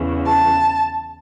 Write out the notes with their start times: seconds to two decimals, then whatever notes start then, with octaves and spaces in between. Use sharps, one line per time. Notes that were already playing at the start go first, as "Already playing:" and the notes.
Already playing: E2 C#3 E3
0.27 A5